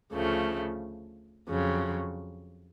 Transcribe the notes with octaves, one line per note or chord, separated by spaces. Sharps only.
D2 C#3 F3 A3
F2 C#3 F#3